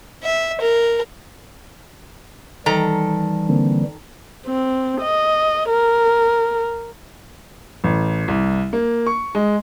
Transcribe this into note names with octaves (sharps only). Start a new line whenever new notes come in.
E5
A#4
D#3 E3 G3 A4 A#5
D3 A#3 C4
C4
D#5
A#4
A1
C2
A#3
C#6
G#3